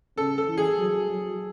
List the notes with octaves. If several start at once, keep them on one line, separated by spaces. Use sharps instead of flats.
C#3 A4
A4
E3
G#4
F#3
F#3